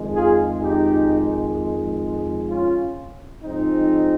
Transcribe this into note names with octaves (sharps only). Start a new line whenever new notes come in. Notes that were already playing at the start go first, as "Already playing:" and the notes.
Already playing: F2 D#3 G#3
F4 G#4
D#4 G4
C#4 F4
G#2 F3 G#3 C4 D#4